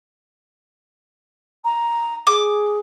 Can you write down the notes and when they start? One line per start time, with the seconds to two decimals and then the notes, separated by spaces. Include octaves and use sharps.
1.64 A#5
2.27 G#4 D6